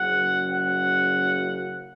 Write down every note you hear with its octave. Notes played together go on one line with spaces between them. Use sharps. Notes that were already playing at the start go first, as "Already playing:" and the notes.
Already playing: F#1 F#2 C#3 F#5
F#5